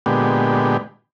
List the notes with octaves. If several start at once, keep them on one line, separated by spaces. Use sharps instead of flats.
A#2 D3 G#3 B3 G4